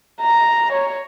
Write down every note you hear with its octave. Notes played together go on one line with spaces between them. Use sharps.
A#5
C#5